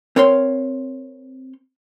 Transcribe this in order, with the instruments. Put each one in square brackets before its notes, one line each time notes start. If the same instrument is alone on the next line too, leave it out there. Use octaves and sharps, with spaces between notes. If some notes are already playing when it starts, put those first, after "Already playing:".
[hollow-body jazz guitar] C4 A#4 C#5 F5 C6